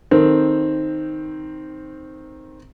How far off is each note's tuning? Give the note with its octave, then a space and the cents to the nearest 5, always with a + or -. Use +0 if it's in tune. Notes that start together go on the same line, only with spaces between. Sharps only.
D#3 +0 C4 +0 A4 +0